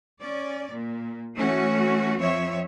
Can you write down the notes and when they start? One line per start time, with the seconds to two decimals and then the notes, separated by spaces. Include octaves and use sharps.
0.20 C#4 D5
0.71 A#2
1.35 E3 A3 C#4 F#4
2.19 F2 F3 C4 C#5 E5